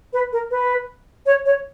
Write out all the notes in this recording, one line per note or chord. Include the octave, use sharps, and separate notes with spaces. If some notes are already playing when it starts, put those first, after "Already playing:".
B4
A#4
B4
C#5
C#5